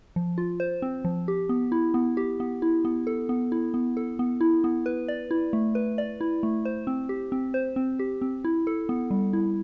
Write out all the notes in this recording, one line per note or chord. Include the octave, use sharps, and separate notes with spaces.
F3
F4
C5
C4
F3
G4
B3
E4
B3
G4
B3
E4
B3
A4
B3
E4
B3
A4
B3
E4
B3
B4
D5
E4
A3
B4
D5
E4
A3
C5
C4
G4
C4
C5
C4
G4
C4
E4
A4
B3
G3
E4